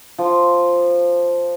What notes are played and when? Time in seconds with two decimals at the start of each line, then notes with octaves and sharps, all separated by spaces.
0.18 F3